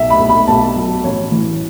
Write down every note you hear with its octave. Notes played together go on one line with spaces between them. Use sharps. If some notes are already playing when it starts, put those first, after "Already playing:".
Already playing: B1 E5
B5
B1
B5
B1 A5
F#3
A1 C#5
E3